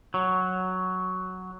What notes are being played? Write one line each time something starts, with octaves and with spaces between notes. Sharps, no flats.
F#3